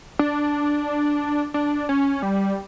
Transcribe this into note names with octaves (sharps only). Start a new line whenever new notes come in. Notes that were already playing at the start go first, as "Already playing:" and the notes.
D4
D4
C#4
G3